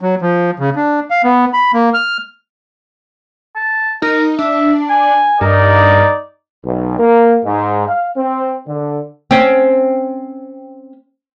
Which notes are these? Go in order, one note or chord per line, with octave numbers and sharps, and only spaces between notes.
F#3
F3
C#3
D4
F5
B3
B5
A#3
F6
A5
D#4 A#4
D4 E5
G#5
G2 D#4 A#4 D5
B1
A#3
G#2
F5
C4
D3
C4 C#4